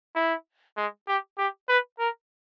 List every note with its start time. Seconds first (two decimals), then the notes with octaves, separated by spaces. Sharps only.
0.15 E4
0.77 G#3
1.08 G4
1.38 G4
1.69 B4
1.99 A#4